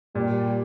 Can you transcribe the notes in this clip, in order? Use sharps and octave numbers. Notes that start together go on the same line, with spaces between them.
A#2 G3